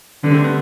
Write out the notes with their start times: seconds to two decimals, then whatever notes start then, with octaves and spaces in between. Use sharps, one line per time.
0.24 D3 G3 B3
0.34 A3 C4
0.44 G3 B3